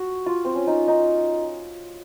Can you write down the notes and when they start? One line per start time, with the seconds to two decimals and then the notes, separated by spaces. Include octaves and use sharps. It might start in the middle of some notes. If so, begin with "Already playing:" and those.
Already playing: F#4
0.26 F4
0.45 C4
0.55 C#4
0.67 D#4
0.88 D#4